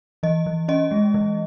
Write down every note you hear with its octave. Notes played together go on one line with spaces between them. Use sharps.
E3 D#5
E3
C#4 D#5
G#3
E3